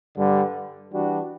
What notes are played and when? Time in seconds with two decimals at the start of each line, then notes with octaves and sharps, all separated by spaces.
0.16 G2 D3 G3
0.92 E3 G3 D4 F#4